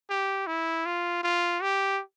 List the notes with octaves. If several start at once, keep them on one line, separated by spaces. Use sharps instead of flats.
G4
E4
F4
F4
G4